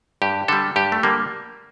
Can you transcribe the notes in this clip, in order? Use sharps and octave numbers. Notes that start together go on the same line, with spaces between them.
G2 G4
D3 G3 A4
G2 G4
A3
D3 G3 A#3